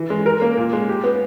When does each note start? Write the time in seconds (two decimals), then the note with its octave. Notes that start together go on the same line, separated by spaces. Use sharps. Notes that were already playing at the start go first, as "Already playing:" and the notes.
Already playing: E3
0.10 G#3
0.26 A#4
0.42 A#3
0.57 A#2
0.73 G#3
0.89 G4
1.04 B3